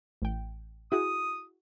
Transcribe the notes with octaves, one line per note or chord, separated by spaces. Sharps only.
A1 G5
E4 F#4 G#4 D#6